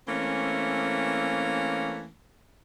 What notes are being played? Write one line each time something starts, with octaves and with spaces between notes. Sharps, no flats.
E3 A3 A#3 C4 C#4